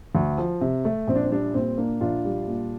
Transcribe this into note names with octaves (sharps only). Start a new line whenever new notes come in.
D2
F3
C3
A3
A#1 C4
D4
C4
G3 D4
A#2 C4
A#3 D4
A#1 D4 F4
G3
A#2